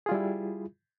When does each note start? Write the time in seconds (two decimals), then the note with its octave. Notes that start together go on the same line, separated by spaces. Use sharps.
0.06 G#4
0.09 F4
0.12 G3
0.14 E4